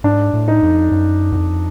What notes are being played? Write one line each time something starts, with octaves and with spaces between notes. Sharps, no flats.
G#2 D4
A2
D#4
F2
F#2
E2
F2